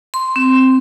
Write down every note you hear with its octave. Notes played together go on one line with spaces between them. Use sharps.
C6
C4